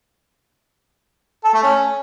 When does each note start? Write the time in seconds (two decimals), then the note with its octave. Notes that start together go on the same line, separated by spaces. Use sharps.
1.44 A4
1.54 A3
1.63 C#4